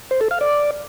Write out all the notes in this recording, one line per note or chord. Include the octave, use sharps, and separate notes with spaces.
C5
A4
F5
D5